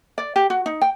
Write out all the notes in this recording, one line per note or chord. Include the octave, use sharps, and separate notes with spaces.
D5
G4
F#4
D#4
G5